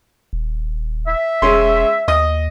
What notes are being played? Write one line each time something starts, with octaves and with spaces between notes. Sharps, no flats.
D#1
E5
E1 G#3 C#4 C6
D#2 D#5 D#6